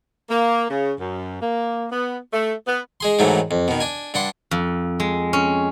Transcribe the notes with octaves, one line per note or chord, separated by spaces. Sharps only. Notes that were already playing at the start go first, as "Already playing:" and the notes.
A#3
C#3
F#2
A#3
B3
A3
B3
G#3 G#4 C6
G#2 D#3 E3 F#3 A3
F2
B2 D#3
D4 G#5
G2 D4 F#5 C6
F2
G#3
C#4